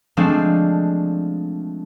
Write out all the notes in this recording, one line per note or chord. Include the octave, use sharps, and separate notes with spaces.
F3 G#3 A3 C4 D4